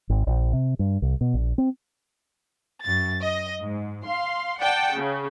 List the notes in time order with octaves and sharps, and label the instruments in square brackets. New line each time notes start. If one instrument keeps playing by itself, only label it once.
[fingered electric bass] G#1
A#1
C3
G2
C2
B2
A#1
C4
[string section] F#2 A6
D#5
G#2
F5 C6
D5 F#5 G5 A5
C#3